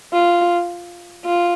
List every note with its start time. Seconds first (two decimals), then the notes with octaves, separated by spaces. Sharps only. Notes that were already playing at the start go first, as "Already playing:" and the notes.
0.13 F4
1.25 F4